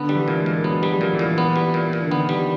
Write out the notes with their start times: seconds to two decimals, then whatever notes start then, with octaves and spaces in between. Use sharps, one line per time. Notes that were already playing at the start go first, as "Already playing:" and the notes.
Already playing: D3 B3
0.09 G3
0.15 E3
0.28 A#2
0.39 G#3
0.46 A#2
0.64 F#3 B3
0.83 F#3 G3
0.89 F3
1.01 A#2
1.13 E3
1.19 A#2
1.38 B3
1.56 G3
1.74 A#2
1.93 A#2
2.00 D3
2.10 D#3 B3
2.29 G3